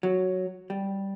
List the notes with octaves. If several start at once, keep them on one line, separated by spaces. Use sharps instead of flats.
F#3
G3